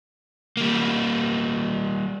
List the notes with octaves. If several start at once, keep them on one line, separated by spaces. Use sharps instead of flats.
G3 A#3